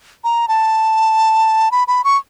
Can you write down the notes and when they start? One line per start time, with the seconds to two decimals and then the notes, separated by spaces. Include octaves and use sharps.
0.24 A#5
0.48 A5
1.71 B5
1.88 B5
2.04 C#6